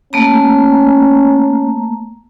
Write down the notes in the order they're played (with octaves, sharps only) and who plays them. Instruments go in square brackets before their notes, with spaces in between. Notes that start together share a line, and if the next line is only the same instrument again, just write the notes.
[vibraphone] A3 A#3 A#5 [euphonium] C#4